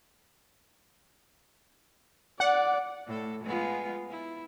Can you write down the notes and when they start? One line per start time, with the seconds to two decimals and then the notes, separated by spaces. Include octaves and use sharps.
2.40 D5 F#5
3.07 A2 A4
3.43 G#3 B3 F4
4.09 E4